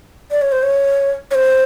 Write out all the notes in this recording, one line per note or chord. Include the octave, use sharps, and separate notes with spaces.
D5
C#5
C5
C#5
C#5
C5